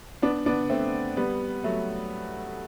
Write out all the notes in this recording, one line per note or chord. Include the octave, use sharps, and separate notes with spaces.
B3 D4
B3 D4
A3 C4
G3 B3
F#3 A3